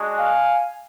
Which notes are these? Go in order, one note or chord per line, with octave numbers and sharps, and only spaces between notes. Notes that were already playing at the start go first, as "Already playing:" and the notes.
Already playing: G#3 D4 F#4
F5 G#5